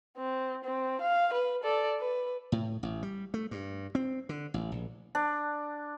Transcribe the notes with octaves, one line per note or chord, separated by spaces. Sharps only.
C4
C4
F5
B4
A4 D5
B4
A2
A1
G3
A3
G2
C4
D3
A1
A#1
D4